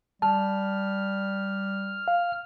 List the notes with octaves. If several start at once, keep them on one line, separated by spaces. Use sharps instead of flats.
G3 A5 F6
F5